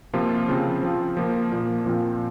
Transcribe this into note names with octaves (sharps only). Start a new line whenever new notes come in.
C3 F3 A#3 F4
C#3 F3 C4
F3 C4 F4
F3 A#3 F4
A#2 F3 A#3
A#2 F3 C4 F4